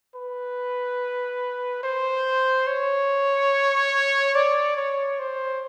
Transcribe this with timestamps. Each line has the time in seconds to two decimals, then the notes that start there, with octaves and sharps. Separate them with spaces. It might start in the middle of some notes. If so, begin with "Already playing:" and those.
0.15 B4
1.83 C5
2.67 C#5
4.35 D5
4.77 C#5
5.19 C5